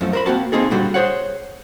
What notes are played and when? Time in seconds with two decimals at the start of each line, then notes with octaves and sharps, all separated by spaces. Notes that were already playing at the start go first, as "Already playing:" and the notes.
0.01 F#2 F3 A3
0.13 A#4 C5 B5
0.26 A#3 C4 F#4 A5
0.52 A#3 C4 D#4 G#4 A4
0.71 A#2 D3 G3 F#4
0.94 G#4 C5 C#5 F#5